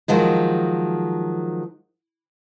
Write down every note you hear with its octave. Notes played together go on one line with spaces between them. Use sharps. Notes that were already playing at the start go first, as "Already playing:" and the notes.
D#3 F3 F#3 G#3